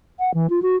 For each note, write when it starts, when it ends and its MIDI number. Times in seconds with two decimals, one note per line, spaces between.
0.20 0.34 78
0.34 0.50 52
0.50 0.60 65
0.62 0.76 66